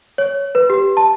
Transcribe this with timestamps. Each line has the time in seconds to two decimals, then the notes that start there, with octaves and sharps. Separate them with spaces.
0.18 C#5
0.55 B4
0.70 G4
0.97 A5